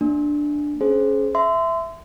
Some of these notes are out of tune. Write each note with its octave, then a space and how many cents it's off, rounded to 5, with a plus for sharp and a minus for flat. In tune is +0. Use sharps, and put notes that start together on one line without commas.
A#3 +0 D4 +5
C#4 +0 G#4 +30 C5 +0
E5 +5 C6 -30